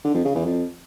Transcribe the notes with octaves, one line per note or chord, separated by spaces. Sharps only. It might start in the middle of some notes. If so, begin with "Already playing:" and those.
D3
F2
C#3
E2
F2